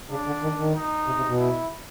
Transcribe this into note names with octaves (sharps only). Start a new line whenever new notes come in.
C#3 D4
D3
D#3
D#3
D#4
C3
C3
B2
E4